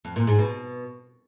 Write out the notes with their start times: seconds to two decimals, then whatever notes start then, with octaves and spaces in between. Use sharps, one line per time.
0.05 F2
0.16 A#2
0.27 G#2
0.39 B2